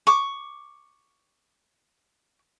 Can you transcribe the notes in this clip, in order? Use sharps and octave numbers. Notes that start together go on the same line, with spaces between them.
C#6 D6